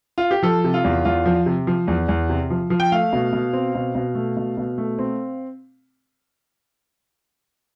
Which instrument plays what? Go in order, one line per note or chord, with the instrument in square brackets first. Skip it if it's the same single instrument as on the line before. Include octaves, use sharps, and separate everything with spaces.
[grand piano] F4
G4
F3 A4
C3
F4
E2
E2 F4
F3
C3
F3
E2
E2
C3
F3
F3
G5
A3 F5
B2
B2
C4
B2
B2
A3
B2
B2
A3
C4